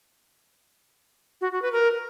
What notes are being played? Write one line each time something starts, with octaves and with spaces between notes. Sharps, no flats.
F#4
F#4
B4
A#4